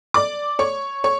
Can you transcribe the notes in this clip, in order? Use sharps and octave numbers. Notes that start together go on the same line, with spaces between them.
D5 D6
C#5 C#6
C#5 C#6